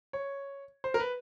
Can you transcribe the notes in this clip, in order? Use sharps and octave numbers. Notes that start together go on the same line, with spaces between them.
C#5
C5
A#4
B4